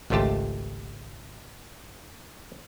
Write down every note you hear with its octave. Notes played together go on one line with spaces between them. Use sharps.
G#1 C#2 A3 F4 G4 A5